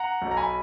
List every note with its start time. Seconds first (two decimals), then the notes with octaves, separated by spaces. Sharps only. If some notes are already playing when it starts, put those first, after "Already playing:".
Already playing: F#5 A#5
0.21 B1
0.31 A#5
0.37 G#5 B5